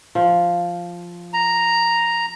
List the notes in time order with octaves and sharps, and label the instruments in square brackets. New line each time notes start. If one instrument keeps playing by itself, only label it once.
[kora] F3
[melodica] A#5